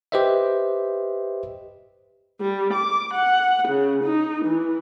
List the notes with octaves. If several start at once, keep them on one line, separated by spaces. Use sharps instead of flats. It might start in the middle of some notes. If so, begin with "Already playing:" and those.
G4 B4 C5 D#5 E5
G3
D6
F#5
C#3
D#4
E3